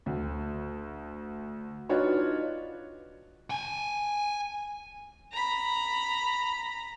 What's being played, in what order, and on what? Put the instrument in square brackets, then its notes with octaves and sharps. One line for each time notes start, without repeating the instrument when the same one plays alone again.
[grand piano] D2
D4 D#4 F4 F#4 B4 C#5
[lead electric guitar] G5 G#5
[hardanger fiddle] A#5 B5